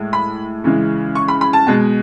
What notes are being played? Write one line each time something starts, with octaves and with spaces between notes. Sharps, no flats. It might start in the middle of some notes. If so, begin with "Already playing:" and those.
Already playing: A2 G#3
B5
C#3 E3 G#3
C#6
B5
B5
A5
B2 G#3